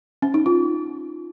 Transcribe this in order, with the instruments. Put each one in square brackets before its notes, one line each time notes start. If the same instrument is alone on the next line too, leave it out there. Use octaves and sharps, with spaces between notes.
[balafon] C#4
D#4
F4